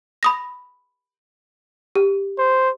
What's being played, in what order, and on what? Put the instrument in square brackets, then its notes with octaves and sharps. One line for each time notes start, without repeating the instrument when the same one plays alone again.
[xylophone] B5 D#6 A#6
G4
[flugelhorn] C5